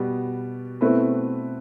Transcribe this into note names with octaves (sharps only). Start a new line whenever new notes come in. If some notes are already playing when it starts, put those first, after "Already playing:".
Already playing: B2 G3 B3
B2 A3 C4 E4 B4